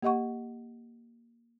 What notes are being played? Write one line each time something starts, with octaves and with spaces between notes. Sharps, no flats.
A#3 G4 D#5 F#5 C#6